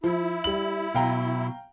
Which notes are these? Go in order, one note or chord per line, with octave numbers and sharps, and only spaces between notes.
F3 E4
G3 F#7
B2 F#3 F5 G5 A#5